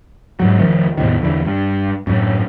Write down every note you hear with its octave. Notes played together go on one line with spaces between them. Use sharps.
G#2 F#3
F1 D#3 F3 A3
E2 A2 C3 D#3
E2 D3 E3
G2
F#2 A2